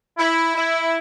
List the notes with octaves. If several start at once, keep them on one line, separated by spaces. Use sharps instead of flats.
E4
E4